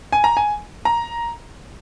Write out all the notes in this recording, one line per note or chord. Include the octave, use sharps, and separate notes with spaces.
G#5
A#5
G#5
A#5